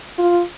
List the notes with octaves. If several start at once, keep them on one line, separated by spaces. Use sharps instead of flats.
F4